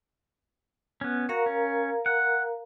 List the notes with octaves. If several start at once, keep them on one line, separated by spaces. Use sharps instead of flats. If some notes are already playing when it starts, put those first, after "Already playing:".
B3 C#4
F#4 A#4 F5 A#5
C#4
F#5